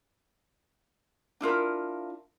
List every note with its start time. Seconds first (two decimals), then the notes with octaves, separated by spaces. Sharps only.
1.41 D4 E4 F4 A#4